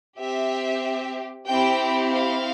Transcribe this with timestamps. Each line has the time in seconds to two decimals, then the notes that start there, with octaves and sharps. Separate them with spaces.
0.19 C4 G4 E5
1.47 C4 E4 G4 G5
2.12 F5